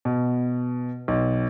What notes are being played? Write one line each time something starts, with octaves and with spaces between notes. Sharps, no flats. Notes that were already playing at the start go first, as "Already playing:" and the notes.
B2
B1